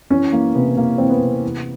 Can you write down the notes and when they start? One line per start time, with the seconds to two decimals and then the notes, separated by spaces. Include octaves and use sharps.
0.10 E3 C#4
0.32 E3 A#3
0.54 C3 B3
0.77 C3 A#3
0.98 E3 C4
1.10 B3
1.21 C3
1.43 E3